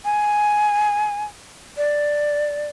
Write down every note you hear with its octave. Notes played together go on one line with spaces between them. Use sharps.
G#5
D5